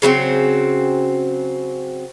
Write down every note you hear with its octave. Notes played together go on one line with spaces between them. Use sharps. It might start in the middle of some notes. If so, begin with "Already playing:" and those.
C#3 F#3 B3 C4